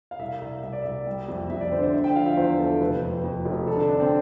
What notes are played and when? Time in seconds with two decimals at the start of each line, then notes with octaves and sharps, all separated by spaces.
0.11 F5
0.19 C2 E5
0.41 C2
0.63 C2 E5
0.73 D5
0.82 C2 E5
1.06 G3
1.28 F2
1.50 F2 E5
1.61 D5
1.72 D3 C5
1.82 C5
1.93 D3 E5
2.04 G5
2.15 F3 F5
2.26 E5
2.37 E2 C5
2.59 B3 A4
2.81 F1 B4
3.02 F2
3.24 F2
3.46 F1
3.67 D3 A4
3.78 D4
3.89 D3 D4
4.00 C4